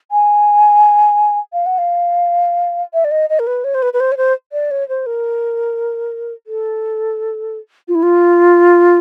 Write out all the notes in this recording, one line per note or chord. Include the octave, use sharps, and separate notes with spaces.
G#5
F5
F#5
F5
E5
D5
D#5
D#5
A#4
B4
C#5
C5
B4
B4
C5
C#5
C5
D5
C#5
C5
A#4
A4
F4
E4
F4